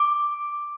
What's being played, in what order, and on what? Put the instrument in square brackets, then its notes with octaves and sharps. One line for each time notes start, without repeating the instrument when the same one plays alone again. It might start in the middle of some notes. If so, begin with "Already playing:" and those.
Already playing: [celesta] D6